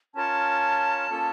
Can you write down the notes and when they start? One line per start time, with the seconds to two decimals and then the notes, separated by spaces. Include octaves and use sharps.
0.15 C#4 F4 A#4 C#5 A5
1.10 A#3 C#4 F4 A4 C#5